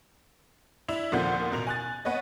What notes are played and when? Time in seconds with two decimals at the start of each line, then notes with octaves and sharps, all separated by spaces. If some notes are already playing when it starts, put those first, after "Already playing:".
0.88 D4 E4 E5 F7
1.12 D#2 A#2 D3 F3 B3 G6
1.51 A1 B2 A#4 F7
1.67 G#5 F#6 A6
2.05 B3 B4 C#5 D#5